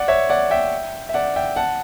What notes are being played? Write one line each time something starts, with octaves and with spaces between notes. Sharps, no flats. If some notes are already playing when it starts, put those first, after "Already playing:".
Already playing: D5 F#5
C#5 E5
D5 F#5
E5 G5
E5
D5 F#5
E5 G5
F#5 A5